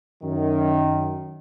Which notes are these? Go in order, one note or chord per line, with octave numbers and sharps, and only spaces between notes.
F#2 D#3